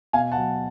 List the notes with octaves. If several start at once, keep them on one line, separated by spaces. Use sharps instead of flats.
B2 F5 G#5
F#5 A5
F#3